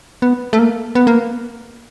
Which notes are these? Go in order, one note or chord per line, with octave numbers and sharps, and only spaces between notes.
B3
A3
A#3
B3
A#3